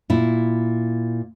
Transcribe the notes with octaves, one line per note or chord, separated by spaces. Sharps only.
A#2 E4